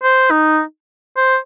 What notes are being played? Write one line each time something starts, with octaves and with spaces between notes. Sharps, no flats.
C5
D#4
C5